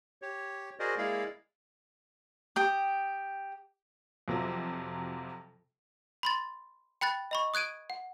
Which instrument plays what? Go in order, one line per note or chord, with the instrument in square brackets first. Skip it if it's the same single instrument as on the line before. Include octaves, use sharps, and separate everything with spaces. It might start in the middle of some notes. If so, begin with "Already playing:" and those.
[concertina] G4 C#5
F#4 G#4 A#4 C5 D5 D#5
G#3 A#3 E4 G#4 D5 F5
[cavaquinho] G4 G5 D#6
[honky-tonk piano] F2 C3 F3 F#3
[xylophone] B5 C6 A6
G5 B5 F#6 A6
D#5 B5 C#6
D#6 F#6 G#6 D7 D#7
F#5